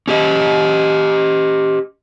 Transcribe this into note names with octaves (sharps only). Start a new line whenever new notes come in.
C#4 G4 D#5